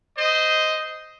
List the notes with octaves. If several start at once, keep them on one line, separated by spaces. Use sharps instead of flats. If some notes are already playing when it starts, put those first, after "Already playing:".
C5 D#5